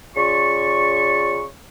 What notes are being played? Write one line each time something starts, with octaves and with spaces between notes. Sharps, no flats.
C#3 F4 D5 C#6